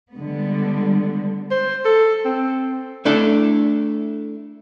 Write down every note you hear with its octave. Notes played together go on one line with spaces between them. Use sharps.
D3 G3 G#3 B3
C5
A4
C4
A3 D4 E4 A4